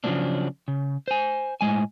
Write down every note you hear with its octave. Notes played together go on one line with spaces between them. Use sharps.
C#3 F3 F#3 G#3 C4 D4
C#3
C5 G#5
A2 G#3 G#5